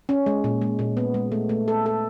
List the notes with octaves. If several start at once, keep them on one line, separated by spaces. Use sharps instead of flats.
C#4
G#3
A#2
G#3
A#2
B3
G#3
A3
A3
A4
A4